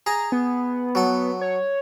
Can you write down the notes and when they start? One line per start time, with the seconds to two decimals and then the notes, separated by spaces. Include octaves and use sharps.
0.06 G#4 A#5
0.32 B3
0.95 F#3 A4
1.41 C#5